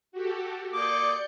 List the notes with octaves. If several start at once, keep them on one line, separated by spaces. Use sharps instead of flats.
F#4 G4 A4
A#3 D5 D6 D#6 G6 C#7